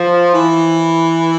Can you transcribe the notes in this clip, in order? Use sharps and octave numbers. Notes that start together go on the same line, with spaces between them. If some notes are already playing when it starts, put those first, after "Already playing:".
Already playing: F3
E3